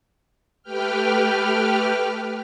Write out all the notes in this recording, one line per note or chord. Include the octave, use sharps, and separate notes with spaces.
A3 G4 B4 G5 F6